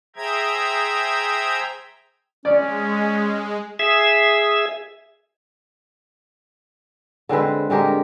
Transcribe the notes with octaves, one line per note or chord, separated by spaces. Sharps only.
G#4 C5 E5 G5 A#5 G#6
G#3 C#4 D5
G#4 E5
D3 G#3 C4 B4
D3 G#3 G4 A#4